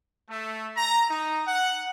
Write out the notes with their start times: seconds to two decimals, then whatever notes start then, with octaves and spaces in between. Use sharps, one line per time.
0.29 A3
0.77 A#5
1.09 D#4
1.47 F#5